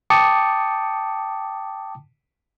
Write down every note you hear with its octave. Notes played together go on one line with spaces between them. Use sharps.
G5 A5 D6 D#6 C#7